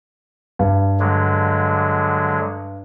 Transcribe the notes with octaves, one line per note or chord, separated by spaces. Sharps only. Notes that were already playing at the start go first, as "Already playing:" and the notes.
G2
D3 F#3 G#3